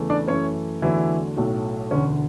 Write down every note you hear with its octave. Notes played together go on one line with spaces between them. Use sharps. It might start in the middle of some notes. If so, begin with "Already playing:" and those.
Already playing: E2 C#3 E3 A3
D4 D5
F#2 E3 A3 C#4 C#5
E2 D3 E3 F#3 A3 E4
B1 A2 F#3 A3
E1 D2 D3 C#4